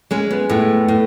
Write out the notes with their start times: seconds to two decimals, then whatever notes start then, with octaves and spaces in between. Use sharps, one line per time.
0.11 G#3 C#4
0.31 B3
0.49 A2 B3
0.88 A2